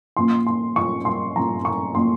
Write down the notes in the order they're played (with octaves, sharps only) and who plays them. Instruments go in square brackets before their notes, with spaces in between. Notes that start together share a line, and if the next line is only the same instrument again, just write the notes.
[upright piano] A#2 F3 A#3 C#4 C6
C6
A#2 F3 A#3 C#4 C#6
C6
A#2 F3 A#3 C#4 A#5
C#6
A#2 F3 A#3 C#4 C6